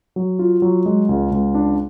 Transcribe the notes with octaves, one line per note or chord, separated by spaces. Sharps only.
F#3
F4
F#3
G#3
C#2
C#2
D4